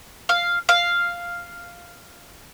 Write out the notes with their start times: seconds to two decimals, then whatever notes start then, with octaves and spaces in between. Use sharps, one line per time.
0.29 F5
0.69 F5